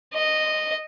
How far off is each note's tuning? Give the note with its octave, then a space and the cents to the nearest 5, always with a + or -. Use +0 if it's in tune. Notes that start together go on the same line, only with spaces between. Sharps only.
D#5 -10